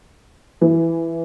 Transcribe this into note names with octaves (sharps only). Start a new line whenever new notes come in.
E3